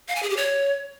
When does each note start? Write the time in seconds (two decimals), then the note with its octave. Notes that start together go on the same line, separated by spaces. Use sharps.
0.08 F5
0.16 G#5
0.23 G#4
0.30 G4
0.37 C#5